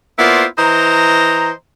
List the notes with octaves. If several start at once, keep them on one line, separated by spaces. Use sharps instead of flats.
A#3 B3 E4 F4 C5 D5
E3 C5 D#5 A#5